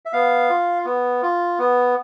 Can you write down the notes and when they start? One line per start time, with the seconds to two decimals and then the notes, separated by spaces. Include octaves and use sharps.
0.05 E5
0.13 B3 F5
0.49 F4
0.85 B3
1.22 F4
1.59 B3